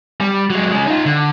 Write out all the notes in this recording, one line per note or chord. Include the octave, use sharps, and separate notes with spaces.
G3
F#3 G#3
G#3 C#4
D#4 F4
D3